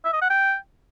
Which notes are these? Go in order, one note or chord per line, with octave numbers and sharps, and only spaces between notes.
E5
D#5
F#5
G5